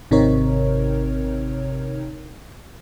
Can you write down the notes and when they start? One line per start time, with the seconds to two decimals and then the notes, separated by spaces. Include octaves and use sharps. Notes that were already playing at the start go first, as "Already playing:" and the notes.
0.11 G#1 C3 C4 D#4 A#4 C#5